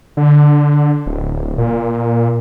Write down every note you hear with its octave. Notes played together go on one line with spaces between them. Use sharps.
D3
D1
A#2